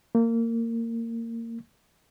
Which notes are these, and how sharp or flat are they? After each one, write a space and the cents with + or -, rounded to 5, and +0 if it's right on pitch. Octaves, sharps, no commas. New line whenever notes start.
A#3 -25